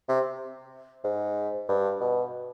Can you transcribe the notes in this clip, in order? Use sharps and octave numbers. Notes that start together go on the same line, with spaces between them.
C3
G#2
G2
B2